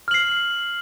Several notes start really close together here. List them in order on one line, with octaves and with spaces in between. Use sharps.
F6 F#7 C7